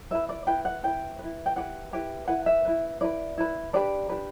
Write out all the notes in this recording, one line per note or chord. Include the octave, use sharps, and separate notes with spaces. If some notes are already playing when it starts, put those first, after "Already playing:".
E4 B4 E5
D5
E4 B4 G5
F#5
E4 B4 G5
E4 B4
G5
E4 G4 B4 F#5
E4 G4 B4
E4 B4 F#5
E5
E4 B4
E4 B4 D5
E4 B4
D4 G4 B4 D5
D4 G4 B4